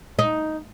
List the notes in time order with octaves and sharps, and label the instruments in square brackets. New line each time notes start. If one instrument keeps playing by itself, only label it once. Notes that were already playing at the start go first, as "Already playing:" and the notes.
[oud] D#4